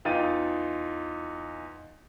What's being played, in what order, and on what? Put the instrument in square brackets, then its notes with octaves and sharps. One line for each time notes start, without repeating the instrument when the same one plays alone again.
[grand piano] E2 D#4 F4 G5 A6 D#7